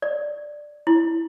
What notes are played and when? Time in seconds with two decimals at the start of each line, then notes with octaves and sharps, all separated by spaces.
0.02 D5
0.87 E4